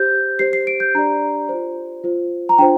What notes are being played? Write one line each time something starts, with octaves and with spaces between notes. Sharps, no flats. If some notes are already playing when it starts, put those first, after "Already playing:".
Already playing: G4 C5 G6
G4 C5 C7
C7
D7
G6
D4 G4 D5 A#5
F4 C5
F4 C5
A#5
D4 F4 C5 G5